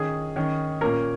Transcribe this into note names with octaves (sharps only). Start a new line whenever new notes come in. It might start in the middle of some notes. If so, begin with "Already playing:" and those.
Already playing: D#3 C#4 G#4
D#3 C#4
A#2 A#3 C#4 A#4